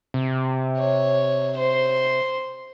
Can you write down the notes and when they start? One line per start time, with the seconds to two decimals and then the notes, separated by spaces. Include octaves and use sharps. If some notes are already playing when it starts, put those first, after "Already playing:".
0.14 C3
0.79 C#5
1.58 C5 C6